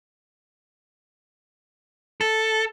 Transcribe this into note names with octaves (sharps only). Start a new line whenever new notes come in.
A4